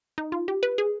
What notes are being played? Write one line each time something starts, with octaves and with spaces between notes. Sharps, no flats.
D#4
F4
G4
B4
G#4